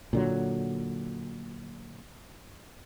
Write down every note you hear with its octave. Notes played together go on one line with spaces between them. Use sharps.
A#2 D3 F#3